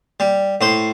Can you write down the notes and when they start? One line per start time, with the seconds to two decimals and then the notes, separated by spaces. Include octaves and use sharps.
0.20 G3
0.61 A2 C5